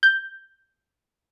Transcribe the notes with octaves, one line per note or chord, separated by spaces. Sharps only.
G6